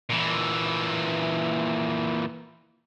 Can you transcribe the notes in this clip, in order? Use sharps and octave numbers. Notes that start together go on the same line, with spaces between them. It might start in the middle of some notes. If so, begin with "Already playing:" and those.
A#2 E3